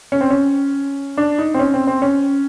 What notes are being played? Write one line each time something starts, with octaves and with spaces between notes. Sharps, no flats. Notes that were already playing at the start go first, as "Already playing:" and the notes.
C#4
C4
C#4
D4
D#4
C4
C#4
C4
C4
C#4